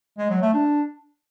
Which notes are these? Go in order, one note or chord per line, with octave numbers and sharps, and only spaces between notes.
G#3
F#3
A3
D4